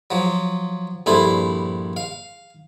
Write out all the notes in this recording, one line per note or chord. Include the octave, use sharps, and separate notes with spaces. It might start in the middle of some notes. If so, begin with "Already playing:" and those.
F3 F#3
A#1 G2 E4 A4 C5
F5